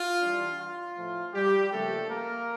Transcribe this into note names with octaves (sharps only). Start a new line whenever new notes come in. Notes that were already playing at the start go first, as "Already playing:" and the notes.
Already playing: F4
E3 G3 D4
F4
A2 F3 A3
G3 G4
C#3 F3 A3 A#3 D4 A4
A#3 A#4